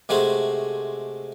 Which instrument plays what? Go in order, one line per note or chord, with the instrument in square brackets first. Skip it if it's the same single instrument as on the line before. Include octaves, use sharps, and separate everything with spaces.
[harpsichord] C3 G#3 A3 F#4 G#4 C5